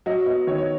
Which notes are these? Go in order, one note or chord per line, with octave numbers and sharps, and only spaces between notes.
F#3 D#5
B3 D#5
D#3 C#5
C#5